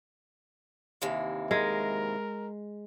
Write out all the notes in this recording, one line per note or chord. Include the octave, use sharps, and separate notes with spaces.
D#2 C3 E3
G#3 A#4